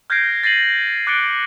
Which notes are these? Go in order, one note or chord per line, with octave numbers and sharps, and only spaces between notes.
F6 G6 G#6 A#6 C7 D7
A6 A#6 C7 D#7 F#7
D6 F#6 A6 C#7 D7 G7